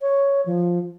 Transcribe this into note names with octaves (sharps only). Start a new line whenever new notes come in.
C#5
F3